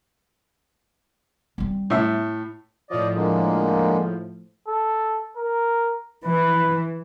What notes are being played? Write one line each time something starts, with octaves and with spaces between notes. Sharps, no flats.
G3 C4
A2 E5
A2 F3 D5 D#5
D3 G#3 A#3
A4
A#4
E3 B4